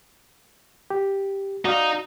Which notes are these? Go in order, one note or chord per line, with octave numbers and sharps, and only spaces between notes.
G4
D#4 F#4 D5 F5